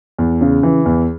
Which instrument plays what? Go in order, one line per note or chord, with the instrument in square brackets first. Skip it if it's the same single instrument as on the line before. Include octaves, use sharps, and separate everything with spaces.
[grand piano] E2
C#3
E3
E2